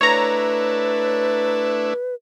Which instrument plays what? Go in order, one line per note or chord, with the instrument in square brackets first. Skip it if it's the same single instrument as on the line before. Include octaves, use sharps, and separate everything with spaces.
[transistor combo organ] A3 D4 E4 [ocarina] B4 [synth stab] C#5 A#5